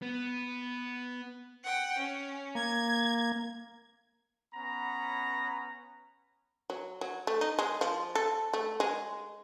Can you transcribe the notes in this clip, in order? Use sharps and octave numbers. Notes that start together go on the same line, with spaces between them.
B3
F#5 G5
C#4
A#3 G#6
B3 C#4 F#5 A#5 B5
F#3
F#3
A3
D#4
G#3
F3
A4
A3
G#3